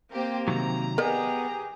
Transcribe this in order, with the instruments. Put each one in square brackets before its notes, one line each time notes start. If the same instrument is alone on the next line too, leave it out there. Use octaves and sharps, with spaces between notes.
[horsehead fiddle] A#3 C4 [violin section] G4 C5
[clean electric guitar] C3 D#3 F#3 [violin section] A#5
[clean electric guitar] B3 [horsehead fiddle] G4 G#4 [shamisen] A#4 D5 D#5